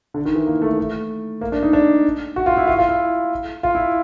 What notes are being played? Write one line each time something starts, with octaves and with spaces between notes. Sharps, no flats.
D3
D#3
E3
A#3
A3
A3
A#3
D4
D#4
D4
F#4
F4
E4
F4
F4
E4
F4
E4